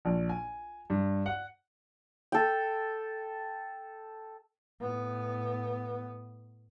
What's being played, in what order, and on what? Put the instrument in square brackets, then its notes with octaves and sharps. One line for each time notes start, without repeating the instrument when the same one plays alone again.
[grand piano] A#1
G#5
G2
F#5
[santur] A4 G5
[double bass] A2 B3